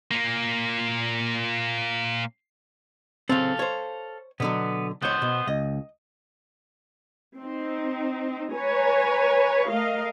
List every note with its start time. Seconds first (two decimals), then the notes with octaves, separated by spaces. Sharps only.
0.11 A#2 A#3
3.29 C#3 C4 A4 F5
3.59 C5 C#5
4.40 B2 D3 F#3 B3
5.02 C#2 B3 C5 C#5
5.22 B2
5.47 C#2 D#5
7.37 C4 D#4
8.51 B4 C#5 G#5 A#5
9.67 A3 A#4 D#5 F5